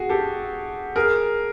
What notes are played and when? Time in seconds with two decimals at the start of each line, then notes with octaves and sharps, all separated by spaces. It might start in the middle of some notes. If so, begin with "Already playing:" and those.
Already playing: F#4 G#4
0.09 G4 A4
0.96 G#4 A#4